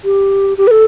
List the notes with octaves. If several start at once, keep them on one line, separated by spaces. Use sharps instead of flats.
G4
G4
B4
A4